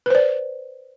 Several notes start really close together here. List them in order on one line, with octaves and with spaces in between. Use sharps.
B4 C5 D5